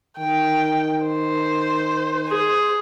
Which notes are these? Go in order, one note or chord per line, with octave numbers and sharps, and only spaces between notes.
D#3 G5
C5
G#4